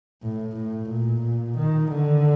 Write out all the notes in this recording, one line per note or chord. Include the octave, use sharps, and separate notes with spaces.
A2
A2
A#2
D#3
D3